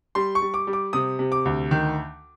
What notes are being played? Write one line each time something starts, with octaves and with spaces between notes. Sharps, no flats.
G3 C6
C#6
G3
D6
G3
D6
C3 D#6
C3
D6
D2
D#3